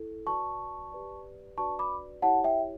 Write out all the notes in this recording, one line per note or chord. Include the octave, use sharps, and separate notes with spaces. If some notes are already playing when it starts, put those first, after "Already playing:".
Already playing: E4 A4
F#4 B4 D5 A5 C#6
G4 B4 D5
D4 F#4 B4 D5 A5 C#6
B5 D6
E4 G4 C#5 F#5 A5
E5 G5